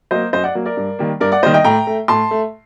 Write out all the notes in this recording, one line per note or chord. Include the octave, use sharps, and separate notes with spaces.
F#3 A#3 C5 D#5
F#2 C5 D#5
D5 F#5
F#3 A#3
A#4 D5
G2
D#3 G3 A#3
G2 A#4 D5
D5 F#5
D#3 G3 A#3 C5 D#5
D#5 G5
A2 G5 A#5
A3
A2 A5 C6
A3